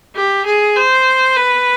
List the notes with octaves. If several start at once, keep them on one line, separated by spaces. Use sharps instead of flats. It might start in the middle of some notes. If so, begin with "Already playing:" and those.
G4
G#4
C5
B4